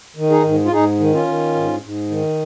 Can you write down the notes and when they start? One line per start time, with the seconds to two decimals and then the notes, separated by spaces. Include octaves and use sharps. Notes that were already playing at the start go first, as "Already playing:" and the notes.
0.16 D#3
0.30 D#4 G#4
0.44 G#2
0.65 F4
0.72 G#2 D#4 G#4
1.00 D#3
1.13 C#4 F4
1.27 D#3
1.55 G#2
1.83 G#2
2.10 D#3